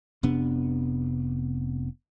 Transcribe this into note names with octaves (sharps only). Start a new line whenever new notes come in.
F1 C3 B3 D4